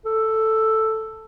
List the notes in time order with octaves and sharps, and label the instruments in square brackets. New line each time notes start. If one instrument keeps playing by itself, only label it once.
[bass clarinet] A4